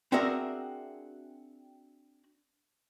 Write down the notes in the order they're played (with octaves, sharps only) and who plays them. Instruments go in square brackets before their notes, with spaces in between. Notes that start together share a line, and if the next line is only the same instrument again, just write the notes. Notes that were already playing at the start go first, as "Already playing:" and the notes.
[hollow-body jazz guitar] C4 D4 F#4 G#4 A#4 E5